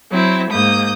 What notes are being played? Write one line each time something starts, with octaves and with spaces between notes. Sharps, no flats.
F#3 C4 E4
G#2 A#3 D#6 G6